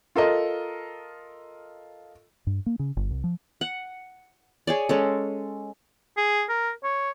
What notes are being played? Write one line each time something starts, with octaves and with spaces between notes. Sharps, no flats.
F4 A4 A#4 D#5
G2
A#3
C#3
G1
C2
F3
F#5
G#4 C#5 D5
G#3 C#4 A4
G#4
A#4
C#5